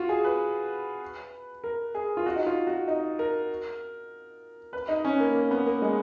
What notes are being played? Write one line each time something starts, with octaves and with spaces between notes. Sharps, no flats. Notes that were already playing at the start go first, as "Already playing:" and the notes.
Already playing: F4 F#4
G#4
B4
A#4
G#4
F4
F#4
D#4
F4
F#4
D#4
A#4
B4
D#4
C#4
A#3
A#3
B3
A#3
G#3